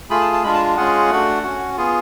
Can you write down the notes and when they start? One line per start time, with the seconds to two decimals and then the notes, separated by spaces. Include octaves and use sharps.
0.10 A3 F4 G#4 B5
0.21 A5
0.33 A5
0.43 G#3 D4 F4 B5
0.54 A5
0.77 G#3 C#4 F4 G#4 F#5
1.10 A3 D4 F#4
1.43 C#4 F#4
1.77 B3 F4 G#4